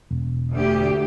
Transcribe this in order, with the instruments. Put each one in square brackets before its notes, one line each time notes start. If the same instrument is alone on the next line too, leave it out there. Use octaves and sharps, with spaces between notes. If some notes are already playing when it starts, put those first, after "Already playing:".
[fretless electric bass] E1
[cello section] D2 G4